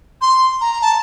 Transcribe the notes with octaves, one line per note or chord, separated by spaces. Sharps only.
C6
A#5
A5